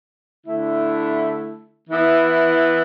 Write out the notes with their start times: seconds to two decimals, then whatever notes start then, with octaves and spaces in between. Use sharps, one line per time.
0.46 D3 A3 E4
1.89 E3 B3 E4